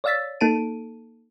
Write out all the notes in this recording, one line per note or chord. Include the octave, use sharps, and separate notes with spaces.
C#5 D5 F5 E6 A6 B6
A#3 D#4 A4 A5 D7 D#7